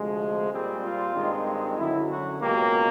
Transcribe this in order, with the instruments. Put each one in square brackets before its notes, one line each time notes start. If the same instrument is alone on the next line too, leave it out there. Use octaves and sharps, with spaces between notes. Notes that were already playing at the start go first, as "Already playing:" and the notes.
Already playing: [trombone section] D2 C3 F3 G#3
A#2 G3 C4 G#4
F4
G2 D#3 G#3 C4
F#2 D3 F#3 E4
F#4
C#2 B2 F#3 A#3 G4